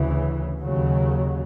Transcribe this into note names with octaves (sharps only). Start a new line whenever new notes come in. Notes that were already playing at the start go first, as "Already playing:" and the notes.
Already playing: D2 C#3 E3
D#2 C#3 F#3